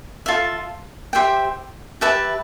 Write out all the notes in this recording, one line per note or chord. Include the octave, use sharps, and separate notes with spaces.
F4 A4 E5
G4 C5 E5 G5
G4 B4 E5 A5